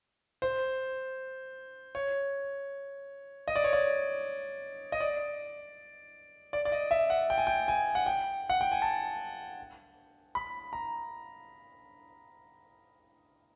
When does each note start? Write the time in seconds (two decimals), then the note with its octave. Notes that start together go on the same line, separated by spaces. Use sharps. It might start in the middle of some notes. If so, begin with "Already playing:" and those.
0.42 C5
1.95 C#5
3.48 D#5
3.56 D5
3.64 C#5
3.73 D5
4.92 D#5
5.00 D5
6.53 D5
6.65 D5
6.72 D#5
6.91 E5
7.10 F#5
7.30 G5
7.38 G#5
7.47 G5
7.68 G#5
7.95 F#5
8.06 G5
8.50 F#5
8.61 G5
8.72 G#5
8.82 A5
10.35 B5
10.73 A#5